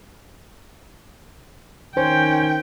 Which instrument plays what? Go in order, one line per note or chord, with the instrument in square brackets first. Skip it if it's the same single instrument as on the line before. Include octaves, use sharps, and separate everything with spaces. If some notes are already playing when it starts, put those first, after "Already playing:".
[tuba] D#3 [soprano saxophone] C#4 [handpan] C5 [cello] G5